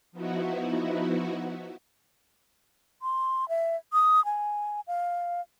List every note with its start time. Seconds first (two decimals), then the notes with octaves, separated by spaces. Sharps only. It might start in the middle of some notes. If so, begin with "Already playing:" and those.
0.12 F3 B3 D#4 E4 F#4
3.02 C6
3.49 E5
3.93 D#6
4.25 G#5
4.87 F5